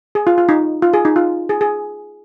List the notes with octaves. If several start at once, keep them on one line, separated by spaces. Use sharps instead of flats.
G#4
F4
F4
D#4
F4
G#4
D#4
F4
G#4
G#4